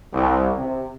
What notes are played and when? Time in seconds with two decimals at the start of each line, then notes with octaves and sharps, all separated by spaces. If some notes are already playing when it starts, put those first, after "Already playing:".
0.13 C2
0.58 C3